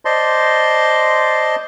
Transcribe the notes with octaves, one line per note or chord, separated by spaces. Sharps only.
C5 D5 D#5 A5 C6